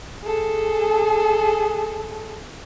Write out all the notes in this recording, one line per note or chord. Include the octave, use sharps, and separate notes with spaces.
G#4 A4